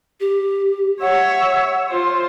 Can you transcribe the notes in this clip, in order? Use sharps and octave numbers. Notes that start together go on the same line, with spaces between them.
G4
C#5 E5 F#5
F4 C5